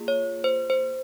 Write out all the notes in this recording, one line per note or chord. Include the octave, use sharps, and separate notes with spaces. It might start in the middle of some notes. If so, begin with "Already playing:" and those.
Already playing: A#3 F4 G#4
C#5
C5
C5